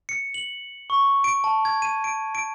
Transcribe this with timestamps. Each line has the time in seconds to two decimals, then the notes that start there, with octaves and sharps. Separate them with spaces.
0.09 C#7
0.34 F#7
0.90 C#6
1.24 D7
1.44 A5
1.65 G#6
1.82 D#7
2.04 D7
2.35 D7